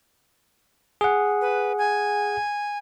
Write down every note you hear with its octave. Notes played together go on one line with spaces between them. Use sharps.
G#4 F#5
B4
G#5